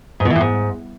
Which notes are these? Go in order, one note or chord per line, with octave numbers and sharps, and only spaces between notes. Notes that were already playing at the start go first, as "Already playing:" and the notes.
G#2
B2
E3
A2
G#2